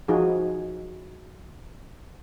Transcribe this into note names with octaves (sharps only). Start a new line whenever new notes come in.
F3 D#4 F4 F#4 G#4